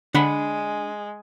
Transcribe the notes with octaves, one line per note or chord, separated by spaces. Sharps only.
D3 G#3 D4 F#5 B5